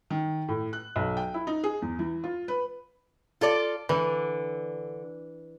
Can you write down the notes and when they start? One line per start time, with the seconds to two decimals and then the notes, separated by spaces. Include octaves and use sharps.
0.10 D#3
0.48 A2
0.73 F#6
0.96 B1
1.17 G5
1.34 E4
1.47 D#4
1.64 G#4
1.82 E2
1.99 E3
2.24 F4
2.48 B4
3.41 F4 A4 D5
3.89 D3 E3